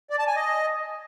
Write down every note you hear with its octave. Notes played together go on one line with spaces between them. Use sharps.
D5
A5
G#5
D#5